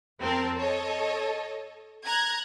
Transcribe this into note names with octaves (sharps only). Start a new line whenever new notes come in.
F2 C4 A#4 A5
A4 C#5 D#5
A#5 F#6 G#6